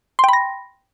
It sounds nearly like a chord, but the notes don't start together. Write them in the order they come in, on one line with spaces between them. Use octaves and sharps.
C6 G5 B5 A#6